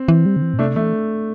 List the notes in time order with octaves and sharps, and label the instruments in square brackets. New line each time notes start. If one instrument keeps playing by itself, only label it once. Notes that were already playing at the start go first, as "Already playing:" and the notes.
Already playing: [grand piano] C4
[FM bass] E3
G3
D3
E3
A2
[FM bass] C3 [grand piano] A3 D4
[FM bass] E3 [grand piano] A3